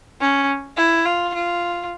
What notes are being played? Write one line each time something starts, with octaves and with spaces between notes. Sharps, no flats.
C#4
E4
F4
F4